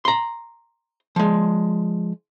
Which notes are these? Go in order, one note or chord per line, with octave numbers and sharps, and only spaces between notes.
A#5 C6
F3 G#3